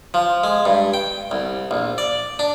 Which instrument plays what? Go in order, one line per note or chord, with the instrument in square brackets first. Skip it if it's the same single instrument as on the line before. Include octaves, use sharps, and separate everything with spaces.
[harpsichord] F3
G#3
G2
G5
C2
A#1
D5
D4